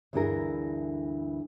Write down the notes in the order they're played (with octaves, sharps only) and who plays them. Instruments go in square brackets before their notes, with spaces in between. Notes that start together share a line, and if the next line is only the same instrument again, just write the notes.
[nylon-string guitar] D2 G2 E3 E4 G#4 A#4